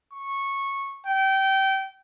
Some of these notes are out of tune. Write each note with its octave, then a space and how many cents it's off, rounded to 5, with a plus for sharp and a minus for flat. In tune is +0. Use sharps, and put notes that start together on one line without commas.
C#6 -15
G5 -25